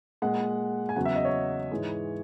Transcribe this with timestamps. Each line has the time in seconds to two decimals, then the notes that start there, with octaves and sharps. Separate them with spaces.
0.22 A#2 G#3 F#5
0.89 G#5
0.96 E2 C#3 F#3 F#5
1.05 E5
1.16 D#5
1.25 C#5
1.71 G#2 E3 G#3